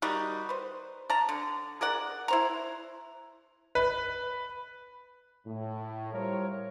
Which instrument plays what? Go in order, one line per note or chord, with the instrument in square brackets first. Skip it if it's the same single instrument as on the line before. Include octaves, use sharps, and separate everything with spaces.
[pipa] D#3 G3 D#4 F#4
B4 C5
D5 A5 A#5
D3
G#4 A#4 D5 F#5
E4 C5 A#5
[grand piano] B4
[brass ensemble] A2
G3 E4 F4 A#4 C5 C#5